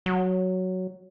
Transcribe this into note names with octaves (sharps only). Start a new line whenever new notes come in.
F#3